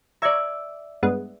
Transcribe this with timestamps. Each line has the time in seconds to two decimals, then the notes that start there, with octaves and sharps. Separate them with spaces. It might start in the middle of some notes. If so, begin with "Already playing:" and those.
0.22 D5 E5 A#5 C#6 G#6
1.03 G2 G#3 B3